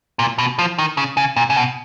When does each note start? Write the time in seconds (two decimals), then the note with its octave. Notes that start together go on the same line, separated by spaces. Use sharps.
0.19 A#2
0.39 B2
0.59 F3
0.78 D#3
0.97 C#3
1.17 C#3
1.36 A#2
1.50 C#3
1.56 B2